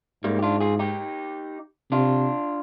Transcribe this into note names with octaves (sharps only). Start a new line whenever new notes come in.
G#2 G3 A#3
G4
D4 F4
F4 G#4
D#4 G4
C3 D4 F4